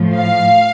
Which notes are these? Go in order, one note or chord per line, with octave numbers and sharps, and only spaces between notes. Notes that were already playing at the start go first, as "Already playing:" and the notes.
Already playing: A2 F3
F5